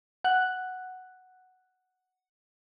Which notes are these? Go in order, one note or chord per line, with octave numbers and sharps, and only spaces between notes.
F#5 F#6